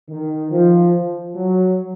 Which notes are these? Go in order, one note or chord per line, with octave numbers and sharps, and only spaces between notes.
D#3
F3
F#3